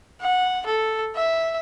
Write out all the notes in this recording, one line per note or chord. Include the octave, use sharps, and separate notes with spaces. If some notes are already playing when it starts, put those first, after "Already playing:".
F#5
A4
E5